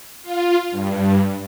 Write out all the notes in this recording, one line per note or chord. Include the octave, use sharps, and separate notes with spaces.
F4
G2